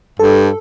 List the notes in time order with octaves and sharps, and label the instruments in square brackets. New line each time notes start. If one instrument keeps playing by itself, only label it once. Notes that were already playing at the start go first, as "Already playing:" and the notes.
[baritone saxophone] G2 [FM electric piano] A4